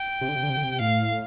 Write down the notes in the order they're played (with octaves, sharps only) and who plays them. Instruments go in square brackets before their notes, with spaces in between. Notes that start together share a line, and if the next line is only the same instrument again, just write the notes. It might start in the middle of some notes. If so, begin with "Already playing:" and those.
Already playing: [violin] G5
[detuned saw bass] C3
D3
C3
D3
C3
D3
C3
[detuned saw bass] A2 [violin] F5